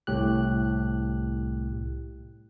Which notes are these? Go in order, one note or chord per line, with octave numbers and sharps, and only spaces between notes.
C2 A2 G4 F#6